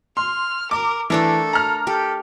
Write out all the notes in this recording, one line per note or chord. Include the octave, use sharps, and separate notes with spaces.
C6 F6
A#4 D6
E3 A3 D4 A4 A#4
A#5 F6
G4 A4